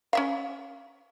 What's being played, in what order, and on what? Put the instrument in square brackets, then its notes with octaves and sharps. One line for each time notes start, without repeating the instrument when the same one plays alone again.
[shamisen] C#4 E5 F5